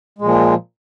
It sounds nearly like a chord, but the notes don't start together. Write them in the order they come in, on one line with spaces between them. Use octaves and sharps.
G#3 A#2 F3